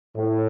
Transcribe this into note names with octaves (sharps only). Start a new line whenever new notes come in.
A2